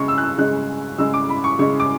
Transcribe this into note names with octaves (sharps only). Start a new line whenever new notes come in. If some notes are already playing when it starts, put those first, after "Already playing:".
Already playing: C#3 G#3 C#6
E6
F#6
E6
C#3 G#3 F#6
C#3 G#3 E6
D6
B5
C#6
C#3 G#3 C#6
D6